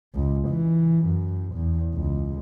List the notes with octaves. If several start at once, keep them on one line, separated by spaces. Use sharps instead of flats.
C#2
E3
F#2
E2
C#2